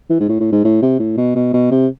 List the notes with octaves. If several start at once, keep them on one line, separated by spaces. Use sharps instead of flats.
E3
G#2
A2
A2
G#2
A2
C3
A2
B2
B2
B2
C3